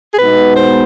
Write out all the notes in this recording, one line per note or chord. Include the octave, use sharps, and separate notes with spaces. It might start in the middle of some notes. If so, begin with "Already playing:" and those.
G#4
B2 G#3 B3 D#4 B4
C5